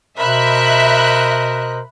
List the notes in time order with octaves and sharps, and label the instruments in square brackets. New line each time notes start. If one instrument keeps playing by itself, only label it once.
[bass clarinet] B2 [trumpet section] A#4 C5 D#5 [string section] E5 [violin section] B5 F#6